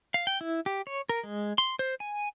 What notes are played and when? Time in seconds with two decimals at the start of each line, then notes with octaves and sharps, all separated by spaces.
0.14 F5
0.27 G5
0.41 E4
0.66 G4
0.87 C#5
1.09 A#4
1.23 G#3
1.58 C6
1.79 C5
2.00 G#5